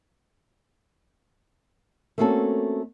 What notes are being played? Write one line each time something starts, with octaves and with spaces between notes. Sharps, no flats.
A3 A#3 C4 C#4 F#4 A4